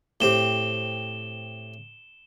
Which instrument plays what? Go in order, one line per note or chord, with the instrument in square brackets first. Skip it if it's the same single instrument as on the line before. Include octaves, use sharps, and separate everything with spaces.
[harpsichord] A2 C4 G4 [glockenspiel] E7 G7